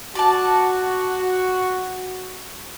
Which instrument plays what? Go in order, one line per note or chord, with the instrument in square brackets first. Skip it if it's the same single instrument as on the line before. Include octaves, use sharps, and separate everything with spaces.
[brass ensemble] F#4 [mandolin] D5 A5